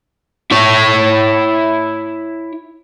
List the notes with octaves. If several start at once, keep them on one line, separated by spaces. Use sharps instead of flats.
E4 C#5